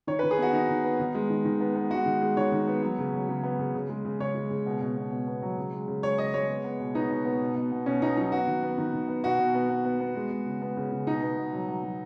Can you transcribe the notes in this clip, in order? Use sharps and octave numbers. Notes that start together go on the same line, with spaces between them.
D#3 C#5
B4
D#3
G#4
B3 F#4
D#3 D#4
D#3
B3
D#3
G#3
D#3
D#3
B3
B3
G#3 F#4
D#3
G#3
D#3 C#5
D#3
B3
F#3
C#3
F#3
C#3
B3
C#3
C#3
G#3
C#3
C#3 C#5
G#3
C#3
B2
B2
B2
B2
B3
F#3
C#3
G#3
C#3
G#3 C#5
C#3 D#5
G#3 C#5
B3
B3
B2
B3 D#4
B2
B3
B2
B2
B2
B2 C#4
B2 D#4
F#3 D#4
B3 F#4
D#3
B3
D#3
D#3
B3
B2 F#4
B2
B3
B3
B3
B3
G#3
G#3
C#3
B3
C#3
C#3
B2 D#4
B3
B2
F#3
F#3
F#3